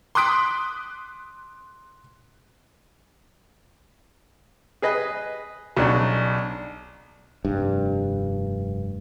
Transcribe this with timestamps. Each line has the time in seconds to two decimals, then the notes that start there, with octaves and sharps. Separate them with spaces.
0.15 C6 D6 D#6 F#6 B6 D7
4.82 G#4 B4 D#5
5.77 B1 C#3 F#3 D4
7.45 F1 G2